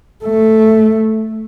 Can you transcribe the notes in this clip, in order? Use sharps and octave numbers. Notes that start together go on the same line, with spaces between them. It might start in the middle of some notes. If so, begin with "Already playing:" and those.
A3